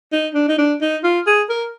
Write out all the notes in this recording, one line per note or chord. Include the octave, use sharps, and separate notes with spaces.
D#4
D4
D#4
D4
D#4
F4
G#4
A#4